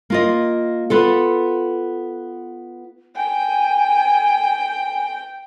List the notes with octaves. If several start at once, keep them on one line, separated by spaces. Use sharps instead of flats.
A#3 F4 D#5
B3 F4 A4
G5 G#5